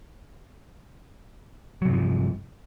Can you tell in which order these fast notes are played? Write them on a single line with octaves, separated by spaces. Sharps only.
F#3 C3 G2 F3